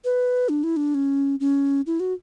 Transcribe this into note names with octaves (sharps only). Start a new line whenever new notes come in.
B4
D4
E4
D4
C#4
C#4
E4
F#4